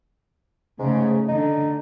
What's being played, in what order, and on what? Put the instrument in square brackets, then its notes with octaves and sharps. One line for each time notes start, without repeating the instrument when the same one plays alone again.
[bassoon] G#2 [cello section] C#3 A3
[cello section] D3 [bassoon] D#4